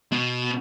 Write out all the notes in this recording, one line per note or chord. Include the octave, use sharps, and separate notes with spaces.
B2